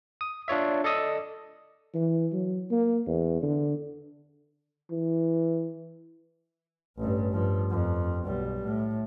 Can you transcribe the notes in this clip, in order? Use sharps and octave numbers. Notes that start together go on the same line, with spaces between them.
D#6
D4 F4 C#5 E5
A4 D5 D#5 D#6 E6
E3
F#3
A#3
E2
D3
E3
A1 G2
G2 F3
F2
B1 G3
A2